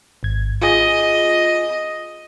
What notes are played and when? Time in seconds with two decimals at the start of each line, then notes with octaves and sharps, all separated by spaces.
0.23 G#1 G#6
0.62 F4 G#4 D#5